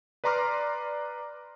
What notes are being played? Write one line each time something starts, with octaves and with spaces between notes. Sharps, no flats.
B4 D5 A#5 C6 D6 F6